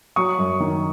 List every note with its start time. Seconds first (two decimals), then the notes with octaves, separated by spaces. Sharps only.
0.16 F#3 C#6 D#6
0.39 F#2
0.60 D#3